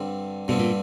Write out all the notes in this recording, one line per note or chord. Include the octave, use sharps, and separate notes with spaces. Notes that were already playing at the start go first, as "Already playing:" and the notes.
Already playing: G2 D3 G3 C4
G2 B2 D3 G3 C4
A#2